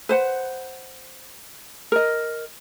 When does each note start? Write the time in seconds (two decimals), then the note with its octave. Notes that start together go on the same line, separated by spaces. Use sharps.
0.09 B4 C5 F#5
1.92 A#4 D#5